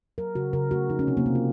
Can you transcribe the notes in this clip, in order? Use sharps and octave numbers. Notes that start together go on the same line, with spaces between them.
F#3 A#4
C#3 F#4
C#3 A#4
A3 F#4
F3 D#4
C#4
C3 C4
A#3
C3 C4
F4